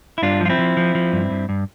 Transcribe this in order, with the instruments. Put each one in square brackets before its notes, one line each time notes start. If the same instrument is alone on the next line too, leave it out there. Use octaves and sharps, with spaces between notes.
[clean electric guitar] E4
G2 D4 F4
F3 F4
C4 E4
F3
F3
F3
G2
G2
G2